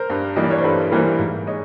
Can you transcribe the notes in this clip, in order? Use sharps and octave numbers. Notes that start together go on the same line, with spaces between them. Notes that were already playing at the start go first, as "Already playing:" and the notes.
Already playing: A#4 C5
G2
E3 G3 A#3 D#5
D5
C#5
C5
G2 A4 B4
E3 G3 A#3 A#4 C5
G#2
G#3 C#5 D#5